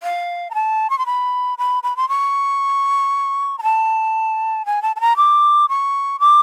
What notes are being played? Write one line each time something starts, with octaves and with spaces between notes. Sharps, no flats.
F5
A#5
A5
C#6
C6
B5
B5
B5
C6
C#6
A#5
A5
G#5
A5
A5
A#5
D6
C#6
D6